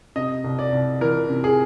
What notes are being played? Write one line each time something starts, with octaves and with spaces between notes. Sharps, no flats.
C3 D#5
C2
D5
C2
E3 A#4
C3
G#4